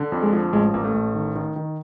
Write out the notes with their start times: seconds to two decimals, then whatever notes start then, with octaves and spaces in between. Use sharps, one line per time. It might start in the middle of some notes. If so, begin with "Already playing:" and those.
Already playing: D3
0.12 F2
0.22 G#3
0.32 F3
0.53 A1 G#3
0.74 A1 A#3
0.84 A3
0.94 A1
1.14 D#3
1.35 D#3
1.56 D#3